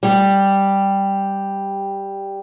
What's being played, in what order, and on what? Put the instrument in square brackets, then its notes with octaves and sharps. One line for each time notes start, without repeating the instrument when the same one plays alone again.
[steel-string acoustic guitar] G3 G4